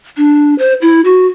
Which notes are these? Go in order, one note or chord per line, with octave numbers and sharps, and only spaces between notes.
D4
C5
E4
F#4